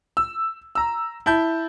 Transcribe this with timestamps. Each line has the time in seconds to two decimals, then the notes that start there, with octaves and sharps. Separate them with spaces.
0.17 E6
0.75 A#5 E6
1.26 E4 A5 G6